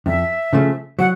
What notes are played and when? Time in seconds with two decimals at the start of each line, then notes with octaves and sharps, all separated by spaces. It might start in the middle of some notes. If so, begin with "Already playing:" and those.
0.06 F2 E5
0.53 C#3 F3 A3
0.99 F#3 F#5